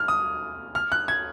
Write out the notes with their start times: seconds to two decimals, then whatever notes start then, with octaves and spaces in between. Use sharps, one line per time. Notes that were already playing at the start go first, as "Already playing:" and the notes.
Already playing: F6
0.08 D#6
0.75 F6
0.92 F#6
1.08 G#6